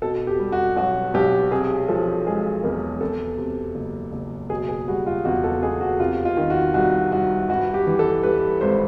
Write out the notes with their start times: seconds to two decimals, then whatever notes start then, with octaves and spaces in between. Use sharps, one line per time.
0.02 B2 A4
0.27 G4
0.39 G3
0.52 F#4
0.76 B1 F#4
1.14 B1 G4
1.51 C3 G#4
1.88 F3 A4
2.27 G#3 G#4
2.63 E2 A#4
3.01 E2 A4
3.38 C3
3.75 F#1
4.13 F#1
4.50 B2 G#4
4.69 G#4
4.87 G3 F#4
5.07 F4
5.25 E2 F#4
5.44 A4
5.63 E2 G#4
5.81 F#4
6.00 C3 F4
6.25 F4
6.37 D#3
6.50 F#4
6.74 C2 F#4
7.11 C2 F#4
7.49 G2 F#4
7.74 G4
7.87 E3
7.99 A4
8.23 G3 B4
8.61 G#1 C5